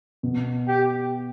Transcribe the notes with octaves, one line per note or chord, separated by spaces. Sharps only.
B2
G4